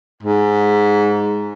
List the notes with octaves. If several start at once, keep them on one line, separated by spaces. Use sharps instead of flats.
G#2